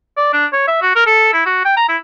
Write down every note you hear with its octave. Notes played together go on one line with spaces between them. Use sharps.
D5
D4
C#5
E5
F#4
A#4
A4
E4
F#4
G5
A#5
E4